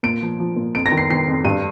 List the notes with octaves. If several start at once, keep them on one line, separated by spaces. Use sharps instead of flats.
A#2 D7
F3
F3
A#2
F2 D7
A#6
D#3
C7
D#3 C7
F2
G2 D#7